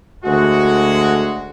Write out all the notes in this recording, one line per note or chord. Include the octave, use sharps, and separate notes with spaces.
D2 G#3 F#4